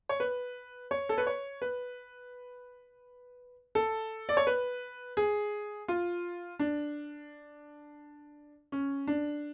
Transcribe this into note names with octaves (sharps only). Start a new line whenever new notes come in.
C#5
B4
C#5
A4
B4
C#5
B4
A4
D5
C#5
B4
G#4
F4
D4
C#4
D4